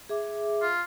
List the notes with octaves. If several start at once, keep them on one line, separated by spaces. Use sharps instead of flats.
G#4 E5 D6
F4